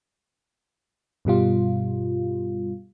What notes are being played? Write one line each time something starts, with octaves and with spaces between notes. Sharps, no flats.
G2 B2 G3 F4